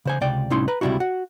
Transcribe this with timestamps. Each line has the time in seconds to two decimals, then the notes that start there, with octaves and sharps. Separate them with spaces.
0.05 C#3 C5 G#5
0.21 C#2 C3 D5 G5
0.50 C2 A2 C#4 D#4 E4 C6
0.68 B4 A#5
0.81 C#2 C3 G3 D4 E4 F#4
1.00 F#4 F#5